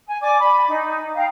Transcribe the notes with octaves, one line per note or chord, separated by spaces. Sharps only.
G#5
D5 G#5 D6
B5
D#4
F5 G5 A#5